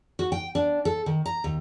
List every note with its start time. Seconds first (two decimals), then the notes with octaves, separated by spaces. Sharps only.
0.19 F#4
0.32 G5
0.55 D4
0.85 A4
1.06 D#3
1.26 A#5
1.44 D#2